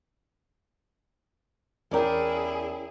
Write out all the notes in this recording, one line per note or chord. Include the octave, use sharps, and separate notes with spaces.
E2 C#4 E4 G#4 A#4 D5 G5